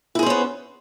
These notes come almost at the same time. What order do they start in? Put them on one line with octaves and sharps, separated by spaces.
E4 G#4 C5 C#4 B3